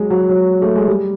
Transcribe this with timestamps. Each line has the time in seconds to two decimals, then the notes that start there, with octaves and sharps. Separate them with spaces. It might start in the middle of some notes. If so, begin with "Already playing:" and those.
Already playing: F#3 G#3
0.10 F#3
0.29 F#3
0.62 A3
0.75 G#3
0.88 G3